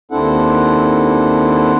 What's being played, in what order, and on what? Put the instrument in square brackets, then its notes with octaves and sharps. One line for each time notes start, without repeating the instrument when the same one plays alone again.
[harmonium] D#2 C4 D4 E4 A4 F#5